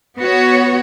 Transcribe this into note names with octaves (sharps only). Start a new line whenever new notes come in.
B3 F#4 C#5